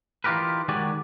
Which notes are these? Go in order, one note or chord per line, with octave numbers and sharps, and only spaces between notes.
E3 D#4 F4 G4 A#4 B4
D#3 G#3 F#4 G4 D5 G#5